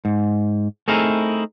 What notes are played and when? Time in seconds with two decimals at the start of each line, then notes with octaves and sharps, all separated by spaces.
0.05 G#2
0.88 A3 C4 D#4 E4 G#4 A#4